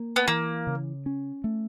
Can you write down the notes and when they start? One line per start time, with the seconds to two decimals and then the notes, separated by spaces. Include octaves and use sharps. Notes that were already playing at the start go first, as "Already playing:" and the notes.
Already playing: A#3
0.16 B3
0.28 E3 A#3
0.67 C#3
1.06 C#4
1.44 A3